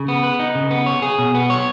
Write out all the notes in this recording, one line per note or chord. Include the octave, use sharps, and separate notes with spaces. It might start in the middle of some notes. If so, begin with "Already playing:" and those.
Already playing: C#3
B3
B4
D#4
C#3
B3
C#5
G#4
B2
B3
C#5